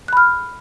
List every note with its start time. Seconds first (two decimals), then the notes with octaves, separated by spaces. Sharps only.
0.08 F#6
0.13 B5
0.17 F6